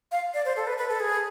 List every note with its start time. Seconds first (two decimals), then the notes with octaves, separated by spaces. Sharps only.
0.12 F5
0.34 D5
0.45 C5
0.56 A4
0.67 B4
0.78 B4
0.89 A4
1.00 G#4